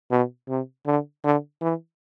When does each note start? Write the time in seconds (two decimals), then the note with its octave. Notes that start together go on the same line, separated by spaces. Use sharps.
0.11 B2
0.48 C3
0.86 D3
1.24 D3
1.61 E3